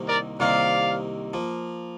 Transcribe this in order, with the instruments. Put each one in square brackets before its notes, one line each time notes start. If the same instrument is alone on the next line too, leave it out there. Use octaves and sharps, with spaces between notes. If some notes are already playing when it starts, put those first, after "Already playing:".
Already playing: [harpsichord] C2 C3 D#3 A#3 D#4
[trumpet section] A#4 D5
[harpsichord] C2 C3 D#3 A#3 D#4 [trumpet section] D5 F5
[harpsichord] F3 A#3